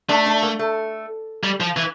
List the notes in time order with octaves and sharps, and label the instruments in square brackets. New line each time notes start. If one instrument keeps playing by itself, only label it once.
[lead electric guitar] A3 [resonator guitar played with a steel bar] D4
[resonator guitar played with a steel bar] D4
A#3
A3
[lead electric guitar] G3
F3
E3